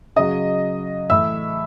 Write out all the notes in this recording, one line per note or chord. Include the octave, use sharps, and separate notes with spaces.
C#3 F#3 D#5 D#6
A2 E3 E5 E6